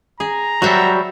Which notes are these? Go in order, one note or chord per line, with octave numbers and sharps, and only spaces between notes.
G#4 A#5
F#3 G3 F#4 C5 E5